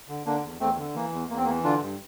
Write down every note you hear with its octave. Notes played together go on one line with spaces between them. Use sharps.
D3
D3 A#3 D4
E2
E2 A3 C4
D3
E3 A#3
E2
E2 A#3
C4
E3 A#3
D3 D4 F4
G2